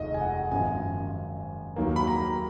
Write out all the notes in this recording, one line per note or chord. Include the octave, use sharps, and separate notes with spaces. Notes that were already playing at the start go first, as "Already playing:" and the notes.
Already playing: F1 D#2 D#3 G#3 D#5
G#5
F#5
G#1 F#2 F3 G#5
D#2 D#3 F#3 A#3
B5
A#5